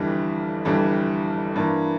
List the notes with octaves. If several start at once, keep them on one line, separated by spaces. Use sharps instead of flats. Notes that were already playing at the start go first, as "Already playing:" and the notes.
Already playing: G1 F2 E3 G3 D4
G1 F2 E3 G3 D4
G2 E3 A#3